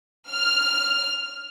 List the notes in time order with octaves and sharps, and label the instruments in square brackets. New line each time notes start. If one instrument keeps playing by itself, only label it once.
[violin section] F6